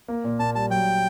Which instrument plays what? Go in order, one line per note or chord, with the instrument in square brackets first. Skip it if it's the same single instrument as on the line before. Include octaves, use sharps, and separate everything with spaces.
[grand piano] A#3
A#2
[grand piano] A#2 [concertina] A5
[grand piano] G3 [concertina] A5
[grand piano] F#3 [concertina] G5